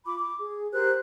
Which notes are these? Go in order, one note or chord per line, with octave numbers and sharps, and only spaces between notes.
F4 B5 D6
D6
G#4
G4 A#4 C5 F#6